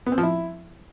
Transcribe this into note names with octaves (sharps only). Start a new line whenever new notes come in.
B3
C4
F3
E4